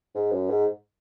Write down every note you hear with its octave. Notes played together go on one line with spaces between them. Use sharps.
G#2
F#2
G#2